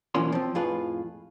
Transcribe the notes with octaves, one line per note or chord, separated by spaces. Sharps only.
B1 E3 F3 A#3 C#4 C6
F3 C4
F2 A2 F4 G#4 B4